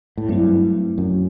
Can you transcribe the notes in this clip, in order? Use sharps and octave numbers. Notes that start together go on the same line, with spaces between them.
A2
G2 F#3 A3 C4 E4
F#2